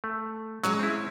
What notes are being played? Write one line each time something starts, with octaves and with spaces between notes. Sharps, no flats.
A3
F#3 G#3 C#4 C#5 A#5
C4 E4